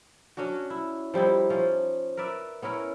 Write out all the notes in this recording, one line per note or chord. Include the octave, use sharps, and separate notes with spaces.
F#3 C#4 D4 F#4
E4
F3 G3 D#4 E4
F3 C#4
A#4 B4 D5 E5
B3 C#4 E4 A#4